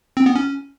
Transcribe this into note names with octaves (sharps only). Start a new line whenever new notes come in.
C4
B3
C#4